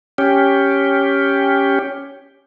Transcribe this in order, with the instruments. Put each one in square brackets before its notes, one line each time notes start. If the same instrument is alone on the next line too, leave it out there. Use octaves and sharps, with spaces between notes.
[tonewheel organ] C#4 G4